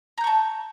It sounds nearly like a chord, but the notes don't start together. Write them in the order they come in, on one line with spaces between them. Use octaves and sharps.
A#5 G6 C#6 A5